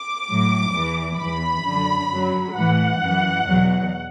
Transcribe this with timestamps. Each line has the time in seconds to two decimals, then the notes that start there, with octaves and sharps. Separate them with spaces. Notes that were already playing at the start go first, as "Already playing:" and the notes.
Already playing: D6
0.28 A2 F#3
0.74 E2 E3
1.19 E2 E3 B5
1.65 F#2 D3 F#3
2.09 F#2 F#3
2.55 A2 E3 F#5
3.00 F#2 E3
3.46 E2 B2 F#3